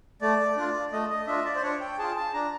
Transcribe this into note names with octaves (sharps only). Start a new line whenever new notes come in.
A3 D5
D4 F4
A3 D#5
D#5
D4 F4 E5
D5
C5
D4 C#5
G5
F4 G#4 A5
A5
D4 A#5